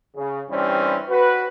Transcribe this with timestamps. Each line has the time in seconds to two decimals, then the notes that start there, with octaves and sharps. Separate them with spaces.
0.16 C#3
0.49 G2 E3 G3 C4 C#4
1.09 F#4 B4